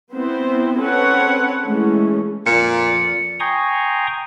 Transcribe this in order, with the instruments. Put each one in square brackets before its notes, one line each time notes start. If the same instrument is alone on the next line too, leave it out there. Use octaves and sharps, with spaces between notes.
[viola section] B3 C4 E4 C5
C4 C#4 A4 B4 C#5 F#5
E3 G#3 A3 C#4
[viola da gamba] F2 F4 D5 [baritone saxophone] A#2 [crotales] C#7
[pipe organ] G5 G#5 A#5 C6 C#6 D#6